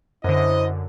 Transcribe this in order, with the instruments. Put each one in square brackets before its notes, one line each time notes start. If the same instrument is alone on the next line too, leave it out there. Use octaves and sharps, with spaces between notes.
[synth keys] F#2 D3 [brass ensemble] E4 C5 D#5